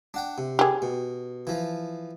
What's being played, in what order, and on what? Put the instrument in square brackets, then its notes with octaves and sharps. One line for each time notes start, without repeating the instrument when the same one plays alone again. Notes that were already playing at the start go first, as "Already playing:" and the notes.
[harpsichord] D4 F#5 G5
C3
[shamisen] G4 G#4
[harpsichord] B2
E3 F3